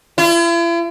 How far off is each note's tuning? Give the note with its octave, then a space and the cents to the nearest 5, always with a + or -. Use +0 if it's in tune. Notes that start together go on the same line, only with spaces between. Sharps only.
E4 +45